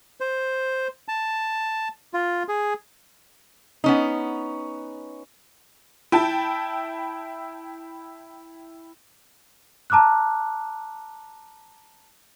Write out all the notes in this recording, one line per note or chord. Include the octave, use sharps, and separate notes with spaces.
C5
A5
F4
G#4
B3 C#4 D#4
E4 G5 A5
A5 A#5 D6 F6 F#6